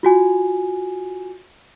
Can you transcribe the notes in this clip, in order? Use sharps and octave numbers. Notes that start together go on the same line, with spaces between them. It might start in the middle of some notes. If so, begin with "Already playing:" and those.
F4 F#4 G#5